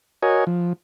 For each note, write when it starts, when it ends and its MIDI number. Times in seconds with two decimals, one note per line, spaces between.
0.22 0.44 66
0.22 0.44 70
0.22 0.44 73
0.22 0.44 75
0.22 0.44 80
0.47 0.73 53